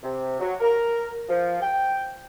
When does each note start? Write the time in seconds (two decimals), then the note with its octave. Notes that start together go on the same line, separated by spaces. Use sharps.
0.03 C3
0.40 F#3
0.61 A#4
1.29 F3
1.61 G5